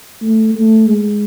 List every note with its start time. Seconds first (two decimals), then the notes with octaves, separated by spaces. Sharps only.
0.22 A3
0.55 A3
0.86 G#3